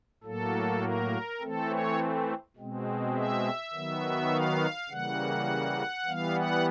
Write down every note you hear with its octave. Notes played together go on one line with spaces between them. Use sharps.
A2 F#3 A#3 A4
A#4
E3 A3 C4 A4
C#5
B2 G#3 C4
E5
D#3 F#3 B3
F5
C#3 E3 G3 A#3 F#5
E3 G3 B3 F5
F#5